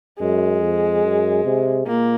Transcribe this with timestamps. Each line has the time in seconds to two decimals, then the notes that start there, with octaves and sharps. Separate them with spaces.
0.19 F#2 G#3
0.62 F2
1.03 F#2
1.45 C3
1.87 A#2 A#3